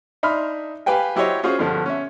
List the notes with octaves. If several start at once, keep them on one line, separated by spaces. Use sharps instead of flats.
D4 D#4 E5 B5 C6 F6
G4 B4 F5 G5 G#5
F#3 E4 G4 C5 C#5 D#5
C#4 F4 F#4 G#4 C5
G2 B2 D3 F3
C#4 E5